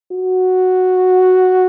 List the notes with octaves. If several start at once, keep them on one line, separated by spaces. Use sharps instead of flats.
F#4